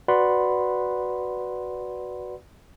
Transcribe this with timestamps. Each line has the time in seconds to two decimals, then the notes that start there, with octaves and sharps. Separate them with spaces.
0.08 F#4 B4 D5 F#5 B5 C6